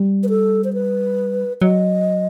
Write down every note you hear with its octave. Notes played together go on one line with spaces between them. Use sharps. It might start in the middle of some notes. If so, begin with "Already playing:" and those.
Already playing: G3
B4
A4
C5
B4
F#3 D#5